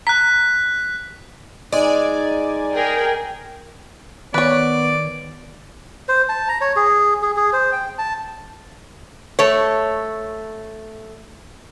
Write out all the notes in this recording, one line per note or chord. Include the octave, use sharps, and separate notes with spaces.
A#5 F#6 B6
G#3 D#4 D5 G#5
G#4 A#4 G5
D#3 B3 B4 C#5 D5
C5
A5
A#5
C#5
G#4
G#4
G#4
C5
G5
A5
A3 C#5